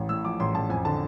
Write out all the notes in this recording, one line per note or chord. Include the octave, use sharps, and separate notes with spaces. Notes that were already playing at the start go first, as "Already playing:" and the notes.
Already playing: A1
A2 E6
F3 D6
A1 C6
A1 A5
F2 G#5
D3 A5